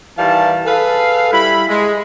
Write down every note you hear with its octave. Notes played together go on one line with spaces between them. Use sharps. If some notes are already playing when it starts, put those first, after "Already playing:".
D#3 E3 G3 F5 A5
G#4 A4 B4 F5
G3 E4 B5
G#3